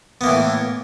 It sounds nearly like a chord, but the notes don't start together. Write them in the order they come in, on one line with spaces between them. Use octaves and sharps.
B3 A#3 E3 A2